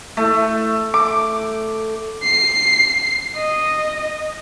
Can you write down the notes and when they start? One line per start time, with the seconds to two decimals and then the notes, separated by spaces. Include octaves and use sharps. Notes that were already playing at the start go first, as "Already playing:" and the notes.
0.17 A3
0.94 D6
2.23 C7
3.36 D#5